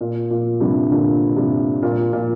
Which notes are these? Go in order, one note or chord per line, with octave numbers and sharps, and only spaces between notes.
A#2
A#2
G2 C3
A#2 D3
G2 C3
A#2
A#2